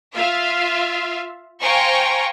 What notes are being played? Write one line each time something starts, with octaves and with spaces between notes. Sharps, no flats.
F4 E5 F5
C5 F5 G5 G#5 A#5 C#6